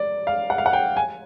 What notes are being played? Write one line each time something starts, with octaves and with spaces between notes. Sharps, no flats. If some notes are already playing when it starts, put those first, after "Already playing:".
Already playing: D5
F5
F#5
F5
F#5
G5
G#5